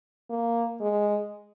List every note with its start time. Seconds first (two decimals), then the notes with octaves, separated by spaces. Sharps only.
0.30 A#3
0.80 G#3